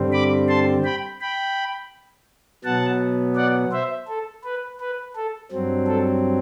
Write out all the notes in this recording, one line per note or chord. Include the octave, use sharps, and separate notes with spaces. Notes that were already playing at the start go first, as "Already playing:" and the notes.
Already playing: G2 D3 G3 C4
B5 D6
A5 C6
G5 B5
G5 B5
B2 F#3 B3 F#5 A5
D5 F#5
C5 E5
A4
B4
B4
A4
G2 F#3 C4
A4